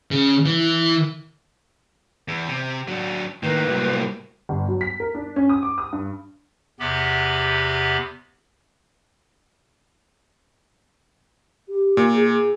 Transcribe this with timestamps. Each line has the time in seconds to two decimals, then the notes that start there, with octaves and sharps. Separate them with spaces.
0.11 C#3
0.46 E3
2.28 E2
2.48 C3
2.88 F#3 D4
3.43 A2 D#3 A#3 B4
3.68 C3 F#3 G3
4.49 G1
4.68 F#3
4.81 B6
5.00 A#4
5.15 D4
5.36 C#4
5.49 D#6
5.63 D6
5.78 D#6
5.92 G2
6.80 E2 C3 B3 G4 B5
11.69 G4
11.97 A#2
12.14 G#4
12.29 G#4